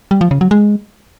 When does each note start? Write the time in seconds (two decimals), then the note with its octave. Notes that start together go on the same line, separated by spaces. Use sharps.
0.11 G3
0.21 F3
0.31 C#3
0.41 F#3
0.51 G#3